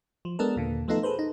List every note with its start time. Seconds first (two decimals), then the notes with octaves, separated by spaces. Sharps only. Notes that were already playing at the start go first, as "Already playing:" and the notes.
0.25 F3
0.39 G#3 B3 D4 A4 A#4
0.56 D#2 A#2 D3
0.88 F3 A3 B3 D#4 F4 A4
1.03 G#4 A4 B4 C5
1.19 D#4